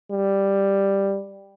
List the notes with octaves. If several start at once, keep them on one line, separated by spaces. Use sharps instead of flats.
G3